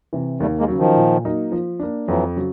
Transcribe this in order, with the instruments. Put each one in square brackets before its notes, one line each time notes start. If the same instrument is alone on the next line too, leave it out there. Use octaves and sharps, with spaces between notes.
[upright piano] C3 E3
[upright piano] D#2 [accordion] G3 A3
[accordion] G#3 A#3
[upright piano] C#3 F#3
[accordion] D#3 F3
[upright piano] A#2
F#3 A#3 D#4
F3
A#3 D4
[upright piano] F2 [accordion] E3 F#3
[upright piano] C#3 F#3